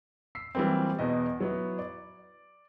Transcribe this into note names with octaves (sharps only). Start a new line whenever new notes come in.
E6 B6 C7
E3 F#3 G3 A#3 C4
E2 B2 B3 D#5
F#3 B3 E4
D5